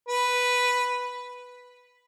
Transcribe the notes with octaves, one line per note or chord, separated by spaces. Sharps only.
B4